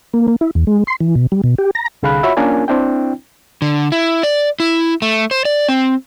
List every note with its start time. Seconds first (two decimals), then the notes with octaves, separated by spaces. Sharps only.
0.14 A#3
0.28 A#3
0.41 E4
0.55 E2
0.67 G#3
0.87 C6
1.00 E3
1.15 B2
1.32 G3
1.44 B2
1.58 G4
1.75 A#5
2.03 C2 D3 G#4 F5 B5 F#6
2.23 F4 F#4 C#5 E5 B5
2.37 A#3 C#4 D4 F4 A#4 G#5
2.68 C4 D4 E4 G5
3.62 D3
3.92 E4
4.23 D5
4.60 E4
5.02 A3
5.31 C5
5.45 D5
5.68 C4